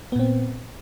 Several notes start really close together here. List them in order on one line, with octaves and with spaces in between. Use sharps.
B3 A#2 C4